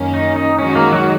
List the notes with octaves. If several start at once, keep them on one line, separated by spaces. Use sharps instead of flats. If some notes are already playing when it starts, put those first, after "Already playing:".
Already playing: F#2 D#3 A#3 C#4
D#4
D#4
D#3 G#3 C#4 D#4 F#4
A#3
F#3